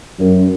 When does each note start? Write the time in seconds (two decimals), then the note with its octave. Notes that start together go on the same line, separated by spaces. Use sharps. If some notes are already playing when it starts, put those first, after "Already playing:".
0.19 F#2